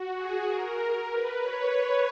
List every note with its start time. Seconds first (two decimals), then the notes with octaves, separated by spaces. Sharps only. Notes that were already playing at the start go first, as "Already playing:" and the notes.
Already playing: F#4
0.15 G#4
0.47 A#4
1.10 B4
1.41 C#5